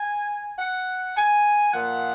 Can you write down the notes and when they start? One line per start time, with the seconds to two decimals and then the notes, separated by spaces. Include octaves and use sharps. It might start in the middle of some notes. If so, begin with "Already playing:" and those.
Already playing: G#5
0.59 F#5
1.16 G#5
1.72 A#2 F3 A#3 F#5